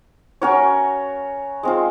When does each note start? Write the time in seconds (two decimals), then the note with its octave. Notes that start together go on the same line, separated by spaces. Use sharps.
0.42 C#4 F#4 A#4 C#5
1.63 G#3 C4 F4